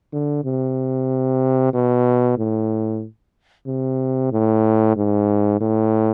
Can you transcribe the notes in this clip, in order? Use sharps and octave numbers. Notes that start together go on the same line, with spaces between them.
D3
C3
B2
A2
C3
A2
G#2
A2